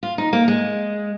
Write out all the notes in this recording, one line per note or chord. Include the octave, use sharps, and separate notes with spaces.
F4
D#4
A#3
G#3